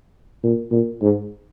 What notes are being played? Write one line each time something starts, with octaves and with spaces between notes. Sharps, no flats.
A#2
A#2
G#2